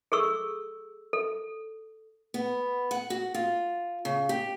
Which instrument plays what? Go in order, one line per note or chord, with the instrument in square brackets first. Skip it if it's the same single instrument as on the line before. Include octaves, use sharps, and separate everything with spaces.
[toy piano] G#4 A4 C#6 E6
A4
[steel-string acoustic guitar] B3
F#5
F#4
F4
C#3
G4